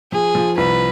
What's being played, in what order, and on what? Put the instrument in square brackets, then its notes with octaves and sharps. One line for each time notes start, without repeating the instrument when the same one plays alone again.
[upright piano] F3 [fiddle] G#4
[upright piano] F3
[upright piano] C2 [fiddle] B4